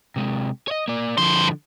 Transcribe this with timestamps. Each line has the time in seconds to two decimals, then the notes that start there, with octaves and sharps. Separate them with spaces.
0.16 C3 G#3
0.68 C#5 D#5
0.88 A#3 D5
1.18 G2 D3 F3 C5